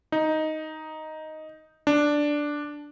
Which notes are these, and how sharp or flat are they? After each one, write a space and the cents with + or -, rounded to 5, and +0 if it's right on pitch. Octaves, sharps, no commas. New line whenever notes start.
D#4 +5
D4 +0